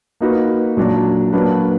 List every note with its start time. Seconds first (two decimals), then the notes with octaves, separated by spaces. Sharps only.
0.21 A#3 D#4 F#4 B4
0.77 A#2 F#3 D4
1.33 F#3 A#3 D4 F#4 B4